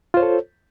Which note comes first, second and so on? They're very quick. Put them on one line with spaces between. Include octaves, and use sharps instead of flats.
F4 C5 C#5 A4